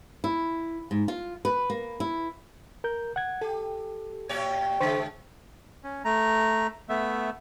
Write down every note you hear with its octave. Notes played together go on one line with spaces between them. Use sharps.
E4
G#2
F4
B4
A#3
E4
A#4 G6
F#5 G#6
G4 A4
A2 G4 C#5
C#3 G#3 C5 C#6
C#4
A3 A#5
A3 B3 E5